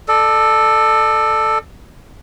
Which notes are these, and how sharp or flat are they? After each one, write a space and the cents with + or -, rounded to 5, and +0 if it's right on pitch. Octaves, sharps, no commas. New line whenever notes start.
A4 +0 D5 +40